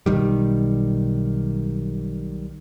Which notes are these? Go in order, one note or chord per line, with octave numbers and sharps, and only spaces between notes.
B1 D#3 G3